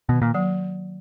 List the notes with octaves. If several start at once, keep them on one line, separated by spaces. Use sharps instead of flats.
B2 D#3
A#2
F#3 A#3